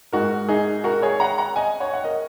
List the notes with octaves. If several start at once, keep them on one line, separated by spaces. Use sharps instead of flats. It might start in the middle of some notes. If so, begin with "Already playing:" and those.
G#2 G#3 F#4 A#4
D#4 G#4
F#4 A#4
G#4 C#5
F#5 A#5
F#5 A#5
D#5 G#5
C#5 F#5
F#5
A#4 D#5